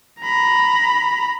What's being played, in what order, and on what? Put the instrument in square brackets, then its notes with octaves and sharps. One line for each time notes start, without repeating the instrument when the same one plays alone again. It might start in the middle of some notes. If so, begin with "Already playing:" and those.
[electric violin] A#5 B5